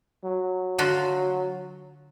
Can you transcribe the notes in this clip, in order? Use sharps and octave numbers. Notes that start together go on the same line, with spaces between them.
F#3
D3 F4 F#4